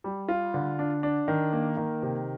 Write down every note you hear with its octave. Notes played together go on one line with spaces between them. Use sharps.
G3
F4
D3
D4
D4
D#3
A#3
D#3
C3